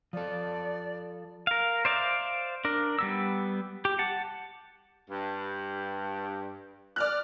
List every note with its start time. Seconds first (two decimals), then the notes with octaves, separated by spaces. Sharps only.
0.13 F3 A4 D5
1.47 A#4 F5
1.85 C5 D5 E5 F5
2.65 D4 A#4
2.99 G3 B3 E6
3.85 G4
3.99 F#5 A5
5.10 G2
6.96 D5 F6 F#6